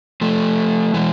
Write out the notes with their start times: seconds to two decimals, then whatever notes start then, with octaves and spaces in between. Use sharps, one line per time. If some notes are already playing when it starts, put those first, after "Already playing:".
0.21 F3 A3
0.94 E3 G#3